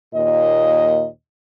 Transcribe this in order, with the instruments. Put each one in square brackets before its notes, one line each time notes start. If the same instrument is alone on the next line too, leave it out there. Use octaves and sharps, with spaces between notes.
[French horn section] D#2 A#2 D#5